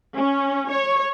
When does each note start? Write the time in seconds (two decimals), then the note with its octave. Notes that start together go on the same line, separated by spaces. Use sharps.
0.16 C#4
0.70 C#5